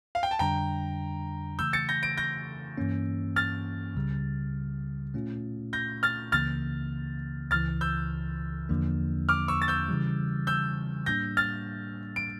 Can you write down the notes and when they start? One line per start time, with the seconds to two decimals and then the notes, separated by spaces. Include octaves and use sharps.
0.15 F5
0.23 G5
0.31 A5
0.39 F2 D3 G3 D4 G5 A#5
1.59 C#3 E3 A3 E6 G6
1.73 A6 C#7
1.89 G6 A#6
2.03 A#6 D7
2.17 G6 A#6
2.78 G2 E3 A#3 C#4
3.36 F6 A6
3.95 C#2 C#3 G3
5.14 A#2 A3 C#4 F4
5.73 G6 A#6
6.03 F6 A6
6.32 C#2 C#3 E3 A#3 F6 A6
7.51 C#2 C#3 E3 F6 A6
7.81 E6 G6
8.69 E2 D3 F3 A#3 D4
9.29 D6 F6
9.48 C#6 E6
9.62 A6
9.68 E6 G6
9.89 C#3 E3 G3
10.47 E6 G6
11.06 A2 G3 A#3 D4 G6 A#6
11.37 F6 A6
12.16 D7